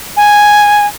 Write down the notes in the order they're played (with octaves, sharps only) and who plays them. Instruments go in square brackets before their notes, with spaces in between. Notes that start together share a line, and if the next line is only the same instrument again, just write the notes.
[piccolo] G#5